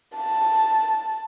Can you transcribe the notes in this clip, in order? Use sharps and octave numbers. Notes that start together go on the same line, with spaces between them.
A5